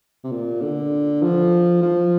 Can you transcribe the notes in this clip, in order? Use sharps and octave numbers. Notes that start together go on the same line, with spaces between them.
C3
A#2
D3
F3
F3